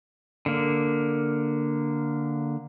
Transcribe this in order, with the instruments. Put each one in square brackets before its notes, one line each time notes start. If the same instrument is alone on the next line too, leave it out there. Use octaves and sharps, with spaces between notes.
[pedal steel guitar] D3 A#3